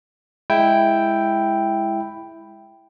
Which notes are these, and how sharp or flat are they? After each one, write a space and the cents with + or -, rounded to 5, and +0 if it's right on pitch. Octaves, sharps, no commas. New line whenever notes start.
G#3 +0 E4 +0 G5 +0